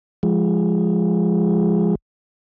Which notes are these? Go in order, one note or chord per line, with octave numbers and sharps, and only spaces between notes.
F3 G#3